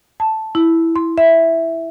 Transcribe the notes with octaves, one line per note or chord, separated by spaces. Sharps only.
A5
E4
C6
E5